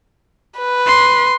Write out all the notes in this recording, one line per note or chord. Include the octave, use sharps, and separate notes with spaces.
B4
C6